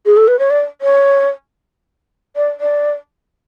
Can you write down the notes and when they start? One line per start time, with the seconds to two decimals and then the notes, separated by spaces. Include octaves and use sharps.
0.06 G#4
0.17 A4
0.28 B4
0.39 C#5
0.50 D5
0.81 C#5
2.36 D5
2.60 D5